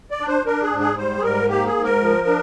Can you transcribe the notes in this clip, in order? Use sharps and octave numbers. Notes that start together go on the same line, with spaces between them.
D5
D4
C5
D4 A#4
G#4
G#2
G#4
G3 C5
G#4
G#2 A#4
A#3 G4
G#4
G#2
A#4
F3
D4